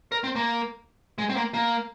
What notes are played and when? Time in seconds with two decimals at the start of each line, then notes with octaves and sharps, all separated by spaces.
0.12 A#4
0.24 C4
0.36 A#3
1.18 G#3
1.29 C4
1.36 A#3
1.54 A#3